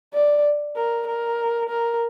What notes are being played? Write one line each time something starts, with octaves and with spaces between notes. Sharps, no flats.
D5
A#4
A#4
A#4